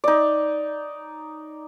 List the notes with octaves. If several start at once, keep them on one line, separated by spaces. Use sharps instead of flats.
D#4 D5